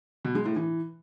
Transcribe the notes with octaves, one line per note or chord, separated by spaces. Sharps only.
B2
G#3
A2
E3